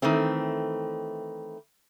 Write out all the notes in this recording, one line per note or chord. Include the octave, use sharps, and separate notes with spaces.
D#3 E3 A3 C4